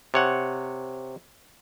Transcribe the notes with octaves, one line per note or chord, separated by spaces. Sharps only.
C3 C#5 F#5